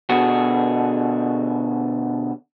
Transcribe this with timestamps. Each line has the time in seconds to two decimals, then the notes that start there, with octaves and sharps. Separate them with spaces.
0.09 B2 D3 F#4 G#4